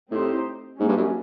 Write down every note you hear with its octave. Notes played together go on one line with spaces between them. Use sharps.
A2 C4 D#4 G4 C5
G#2 G3 A#3 C#4
G2
F#2